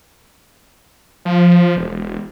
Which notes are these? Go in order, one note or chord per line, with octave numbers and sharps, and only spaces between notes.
F3
E1